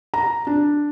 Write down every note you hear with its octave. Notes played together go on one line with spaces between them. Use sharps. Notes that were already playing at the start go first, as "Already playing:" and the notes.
A#5
D4